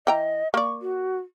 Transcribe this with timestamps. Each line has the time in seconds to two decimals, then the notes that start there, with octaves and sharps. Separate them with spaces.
0.07 E3 D#5 G5 A#5
0.54 A#3 D5 C#6
0.82 F#4